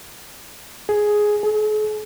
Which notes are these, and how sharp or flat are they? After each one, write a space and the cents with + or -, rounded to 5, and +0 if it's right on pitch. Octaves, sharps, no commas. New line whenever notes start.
G#4 +5
G#4 +45